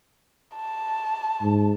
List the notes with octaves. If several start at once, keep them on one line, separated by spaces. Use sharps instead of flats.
A5
G#2